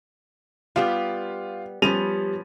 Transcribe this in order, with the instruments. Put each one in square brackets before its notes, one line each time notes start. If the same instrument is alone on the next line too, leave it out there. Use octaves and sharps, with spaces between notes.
[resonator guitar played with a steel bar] G3 B3 G4 [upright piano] F4
[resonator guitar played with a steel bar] F3 B3 C#4 [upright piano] G3 D#7 F7